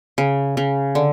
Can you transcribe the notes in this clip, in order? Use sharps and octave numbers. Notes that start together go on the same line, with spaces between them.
C#3
C#3
D3